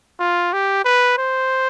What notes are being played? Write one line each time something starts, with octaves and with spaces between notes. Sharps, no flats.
F4
G4
B4
C5